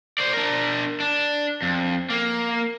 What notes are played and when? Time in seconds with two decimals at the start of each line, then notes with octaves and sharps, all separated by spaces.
0.18 C5 D5
0.33 D4 A#4
1.00 D4
1.62 F2
2.10 A#3